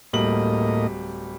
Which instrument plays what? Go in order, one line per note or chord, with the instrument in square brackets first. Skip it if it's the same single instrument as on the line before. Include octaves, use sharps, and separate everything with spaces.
[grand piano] D1 G3 F#7 [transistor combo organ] A2 A#3 D#5